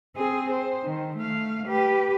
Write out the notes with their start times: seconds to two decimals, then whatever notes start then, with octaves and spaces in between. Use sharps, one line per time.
0.16 C4 G#4
0.51 C5
0.84 D#3
1.17 A3 F5
1.66 G4 B4